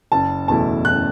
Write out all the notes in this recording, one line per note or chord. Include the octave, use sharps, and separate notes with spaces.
F#1 A5
E2 B2 A3 E4 A5
F#1 F#6